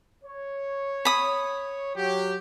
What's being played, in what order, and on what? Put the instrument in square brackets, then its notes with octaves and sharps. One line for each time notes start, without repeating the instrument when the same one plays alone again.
[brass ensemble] C#5
[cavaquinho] B5 D#6
[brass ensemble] F#3 G4